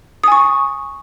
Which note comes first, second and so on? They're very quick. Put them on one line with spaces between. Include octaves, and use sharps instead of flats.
D#6 G#5 C#6